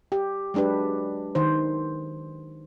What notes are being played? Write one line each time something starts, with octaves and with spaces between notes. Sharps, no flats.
G4
F#3 G#3 D4 G4 B4
D#3 C5